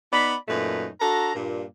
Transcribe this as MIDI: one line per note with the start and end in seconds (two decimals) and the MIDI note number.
0.12 0.34 59
0.12 0.34 63
0.12 0.34 74
0.12 0.34 83
0.48 0.87 42
0.48 0.87 46
0.48 0.87 57
0.48 0.87 63
0.48 0.87 71
1.01 1.33 62
1.01 1.33 66
1.01 1.33 69
1.01 1.33 82
1.35 1.63 43
1.35 1.63 46